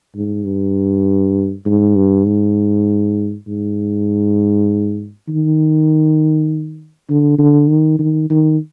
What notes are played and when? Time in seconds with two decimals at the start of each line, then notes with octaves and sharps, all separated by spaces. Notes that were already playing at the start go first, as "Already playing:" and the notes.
0.15 G#2
0.46 G2
1.66 G#2
1.96 G2
2.26 G#2
3.47 G#2
5.29 D#3
7.10 D3
7.39 D3
7.69 D#3
7.99 D#3
8.30 D#3